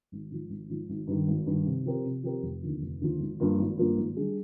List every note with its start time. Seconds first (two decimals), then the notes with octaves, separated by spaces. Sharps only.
0.12 G#1
0.31 G#2 F3
0.50 G#1
0.69 G#2 F3
0.89 G#1
1.07 G2 D#3
1.28 G#1
1.47 G2 D#3
1.66 C3
1.85 F3 C4 G4 A#4
2.05 C3
2.23 F3 C4 G4 A#4
2.42 F1
2.62 D#2 D3 F3
2.82 F1
3.01 D#2 D3 F3
3.20 G#1
3.40 G2 F3 A#3 F4
3.59 G#1
3.78 G2 F3 A#3 F4
3.97 G#1
4.17 G3 D4 G#4